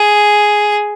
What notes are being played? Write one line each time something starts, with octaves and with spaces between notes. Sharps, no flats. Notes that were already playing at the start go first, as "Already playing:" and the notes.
Already playing: G#4